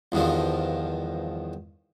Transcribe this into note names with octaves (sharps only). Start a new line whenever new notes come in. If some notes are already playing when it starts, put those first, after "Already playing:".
E2 G2 D#3 F3